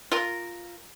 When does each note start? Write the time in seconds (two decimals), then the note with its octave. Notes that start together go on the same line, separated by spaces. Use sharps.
0.12 F4 A#4